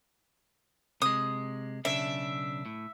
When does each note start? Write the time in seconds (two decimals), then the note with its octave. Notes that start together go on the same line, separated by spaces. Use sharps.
1.02 C3 G#3 D#6
1.85 B1 C#3 D4 E5
2.66 A2